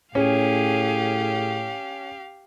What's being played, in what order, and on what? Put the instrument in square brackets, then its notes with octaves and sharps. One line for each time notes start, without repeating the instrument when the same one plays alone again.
[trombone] A2 [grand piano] C#4 [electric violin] G4 F5 [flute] G#4